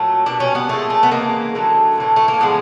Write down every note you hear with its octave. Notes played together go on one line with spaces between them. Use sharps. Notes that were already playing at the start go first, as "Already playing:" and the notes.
Already playing: A#2 F#3 A3
B2 G3 D4
C#4
B3
A#2 F3 G#3 A3
A3
B3
C#3 E3 G#3 A#3
D3 F#3 A3
A2 E3 A3
A3
A#3
A2 F3 G#3 B3